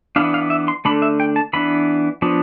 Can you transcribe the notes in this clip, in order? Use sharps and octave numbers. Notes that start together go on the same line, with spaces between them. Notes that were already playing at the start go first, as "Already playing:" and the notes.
E3 B3 D4 F5
F5
E5
C6
D3 A3 D4 B5
E5
G5
A5
E3 B3 D4 B5
F3 B3 D4